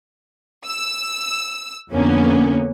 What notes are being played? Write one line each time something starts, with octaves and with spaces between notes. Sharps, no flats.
E6
F2 D3 A#3 B3 C#4